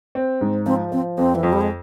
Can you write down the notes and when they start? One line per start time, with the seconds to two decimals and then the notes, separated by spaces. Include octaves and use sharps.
0.15 C4
0.41 G#2
0.66 F3 C4
0.92 F3 C4
1.18 F2 C4
1.35 E3
1.43 F2 F3
1.53 G3
1.61 G#3